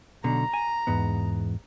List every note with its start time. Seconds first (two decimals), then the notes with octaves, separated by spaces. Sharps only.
0.24 B1 B2 D3 A#5
0.54 G#5
0.87 E2 G#2 B3